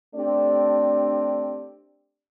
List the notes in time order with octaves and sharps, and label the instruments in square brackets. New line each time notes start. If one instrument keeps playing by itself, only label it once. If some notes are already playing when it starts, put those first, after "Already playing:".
[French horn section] A3 C4 D4 G4 D5